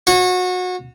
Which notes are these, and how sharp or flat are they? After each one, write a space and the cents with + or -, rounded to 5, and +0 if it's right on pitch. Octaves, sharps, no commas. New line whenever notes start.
F#4 -25 C#5 -25